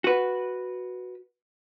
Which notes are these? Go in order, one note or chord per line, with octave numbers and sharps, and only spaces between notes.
F#4 B4